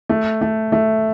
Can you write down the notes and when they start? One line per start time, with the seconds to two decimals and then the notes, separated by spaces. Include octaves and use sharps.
0.09 A3
0.41 A3
0.72 A3